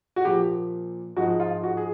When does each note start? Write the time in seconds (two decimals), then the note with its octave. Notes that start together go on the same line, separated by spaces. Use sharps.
0.16 F#4
0.25 A#2 F3 A#3 G4
1.17 G#2 F3 G#3 F#4
1.40 F4
1.63 F#4
1.77 G#4